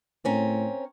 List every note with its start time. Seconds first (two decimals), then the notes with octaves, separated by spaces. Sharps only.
0.25 A2 C4 C#4 A#4